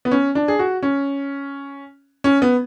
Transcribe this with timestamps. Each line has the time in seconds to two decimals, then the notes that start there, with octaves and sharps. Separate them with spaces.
0.05 B3
0.11 C#4
0.35 D4
0.48 G#4
0.59 F#4
0.83 C#4
2.24 C#4
2.42 B3